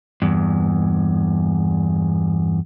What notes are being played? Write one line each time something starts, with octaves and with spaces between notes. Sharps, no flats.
E2 G2